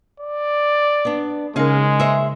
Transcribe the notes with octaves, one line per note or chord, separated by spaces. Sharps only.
D5
B3 D4
C#3 G#3 C#4 D#4 A#4 F5
C5 C#5 E5